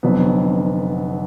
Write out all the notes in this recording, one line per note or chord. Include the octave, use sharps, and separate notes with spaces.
F1 F2 D3 F#3 B3